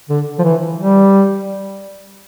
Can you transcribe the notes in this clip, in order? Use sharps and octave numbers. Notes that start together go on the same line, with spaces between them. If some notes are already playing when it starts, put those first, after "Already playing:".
D3
F3
E3
G3